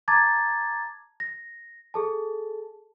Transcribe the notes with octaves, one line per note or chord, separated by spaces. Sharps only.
A5 A#5 D6 G#6 A6
A#6
G#4 A4 A5